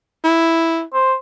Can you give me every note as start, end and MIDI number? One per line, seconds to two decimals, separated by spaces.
0.24 0.82 64
0.94 1.15 72